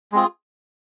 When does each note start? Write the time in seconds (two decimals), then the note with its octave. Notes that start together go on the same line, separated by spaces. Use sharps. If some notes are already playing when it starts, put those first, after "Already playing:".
0.12 G#3 C4 F4 G#4